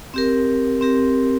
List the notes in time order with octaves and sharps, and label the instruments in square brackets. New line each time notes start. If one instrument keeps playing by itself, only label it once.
[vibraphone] C4 G4 A#4
C4 G4 A#4